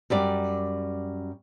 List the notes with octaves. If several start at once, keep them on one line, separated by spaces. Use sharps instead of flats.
F#2 G3 D5